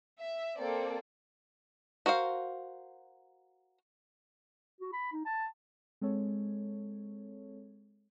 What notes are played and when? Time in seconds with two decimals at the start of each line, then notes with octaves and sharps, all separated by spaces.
0.20 E5
0.58 A#3 C4 A4 D5
2.06 F#4 A#4 C5 F5
4.81 F#4
4.93 B5
5.13 D#4
5.26 A5
6.01 G#3 C4 A4 C#5